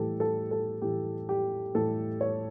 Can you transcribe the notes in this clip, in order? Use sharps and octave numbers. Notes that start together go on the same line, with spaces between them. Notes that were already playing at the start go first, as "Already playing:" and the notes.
Already playing: A2 E3 G3 G4 A4
A4
A4
A2 E3 G3 G4
G4
A2 E3 G3 A4
C#5